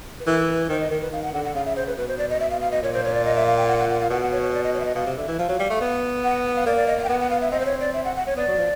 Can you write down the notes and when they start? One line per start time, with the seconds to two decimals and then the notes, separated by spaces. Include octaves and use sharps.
0.20 B4
0.26 E3 A#4
0.48 B4
0.69 D#3 C5
0.80 D#5
0.90 D#3 A#4
1.01 B4
1.12 D#3 F5
1.23 F#5
1.34 D3 F#5
1.45 F#5
1.55 C#3 F5
1.66 E5
1.76 C5
1.87 B4
1.97 B2 B4
2.08 C5
2.18 D5
2.30 D#5
2.40 E5
2.51 F5
2.61 F5
2.72 D#5
2.82 A#2 C#5
2.94 C5
3.04 C#5
3.14 D5
3.25 D#5
3.36 E5
3.47 F5
3.57 G5
3.68 F#5
3.78 F#5
3.89 F#5
4.00 F5
4.10 B2 F#5
4.21 F#5
4.32 C#5
4.42 C#5
4.53 D5
4.63 D#5
4.74 C#5
4.80 E5
4.85 D#5
4.95 B2 F5
5.07 C3
5.17 D3 E5
5.28 E3
5.39 F3 F5
5.49 F#3
5.60 G3
5.70 A3
5.81 B3
6.24 F#5
6.45 F#5
6.56 F5
6.66 A#3 D5
6.77 D5
6.87 D#5
6.98 F5
7.04 G5
7.09 B3 F#5
7.20 F#5
7.30 F5
7.41 E5
7.51 C4 D#5
7.60 C5
7.65 C#5
7.80 D5
7.94 E5
8.05 F#5
8.16 F#5
8.27 C#5
8.36 B3 D5
8.48 F#3
8.58 F3